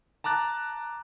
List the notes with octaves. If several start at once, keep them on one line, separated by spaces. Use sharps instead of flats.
A5 A#5 D6 F#6 A6